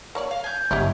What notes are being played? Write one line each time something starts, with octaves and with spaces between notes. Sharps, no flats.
A#3 C#5 D5
F5
G#5 G6
G1 E4 G4 C#5 D#5